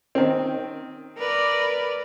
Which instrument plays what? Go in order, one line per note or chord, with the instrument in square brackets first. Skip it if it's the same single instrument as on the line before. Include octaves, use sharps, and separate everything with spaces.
[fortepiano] D#3 C4
[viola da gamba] A#4 B4 D5